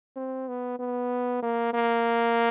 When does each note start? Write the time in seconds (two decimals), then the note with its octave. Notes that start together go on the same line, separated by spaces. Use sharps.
0.16 C4
0.48 B3
0.79 B3
1.43 A#3
1.74 A#3